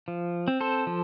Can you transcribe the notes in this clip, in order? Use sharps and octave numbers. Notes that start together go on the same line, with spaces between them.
F3
C4
A4 C5
F3